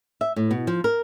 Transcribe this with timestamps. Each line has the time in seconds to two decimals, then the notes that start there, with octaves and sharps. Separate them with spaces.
0.21 E5
0.36 A2
0.51 B2
0.67 F3
0.84 A#4